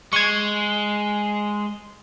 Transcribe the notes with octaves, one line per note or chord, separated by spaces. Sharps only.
G#3 C#6 G#6